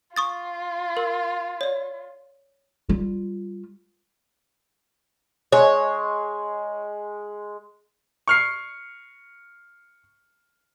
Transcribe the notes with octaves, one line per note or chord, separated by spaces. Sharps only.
F4 C#6 D#6 A6
A#4 E6
C#5 D5
G3 F4
G#3 C#5
C#6 F6 C7